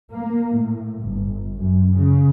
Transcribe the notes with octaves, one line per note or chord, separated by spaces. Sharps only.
A#3
A2
G1
F#2
C#3